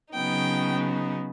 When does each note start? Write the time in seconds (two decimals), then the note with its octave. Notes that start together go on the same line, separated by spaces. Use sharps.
0.13 C#3 F#3 B3 D#4 G5